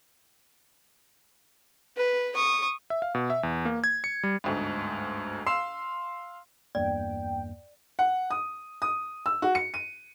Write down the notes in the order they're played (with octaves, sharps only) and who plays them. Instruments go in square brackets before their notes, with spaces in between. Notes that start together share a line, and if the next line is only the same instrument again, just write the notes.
[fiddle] B4
C#6 D#6
[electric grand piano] E5
F5
B2
E5
E2
A#3
G#6
C#7
G3
[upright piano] G1 D2 G#2
F5 C6 E6 C7 E7
[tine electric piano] E2 G2 A#3 [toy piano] D5 [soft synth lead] G5
[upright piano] F#5
D#6
D#6
E6
F#4
C#7
D#7